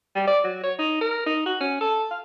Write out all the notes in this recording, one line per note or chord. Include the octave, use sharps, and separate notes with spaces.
G3
D5
F#3
C#5
D#4
A#4
D#4
F#4
C#4
A4
F5